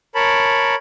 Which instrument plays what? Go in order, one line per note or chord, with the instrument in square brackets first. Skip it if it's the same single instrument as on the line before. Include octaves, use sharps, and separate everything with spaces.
[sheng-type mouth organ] A#4 C#5 A5 B5